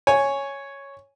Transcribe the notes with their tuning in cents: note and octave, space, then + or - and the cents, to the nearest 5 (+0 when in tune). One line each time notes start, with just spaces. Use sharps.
C#5 +0 G#5 +0